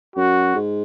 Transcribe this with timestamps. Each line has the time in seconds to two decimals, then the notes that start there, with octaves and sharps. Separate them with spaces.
0.16 F#2 F#4
0.55 G#2